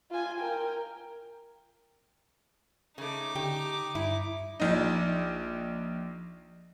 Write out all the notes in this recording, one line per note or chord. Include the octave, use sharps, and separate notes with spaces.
F4 G#5
A#4 G5
C#3 A3 D#4 D6
D3 G4
G2 E4
A#1 D#4